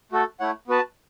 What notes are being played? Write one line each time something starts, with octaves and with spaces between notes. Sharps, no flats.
A3 F#4 A4
A3 E4 C#5 F#5
B3 F#4 B4 A5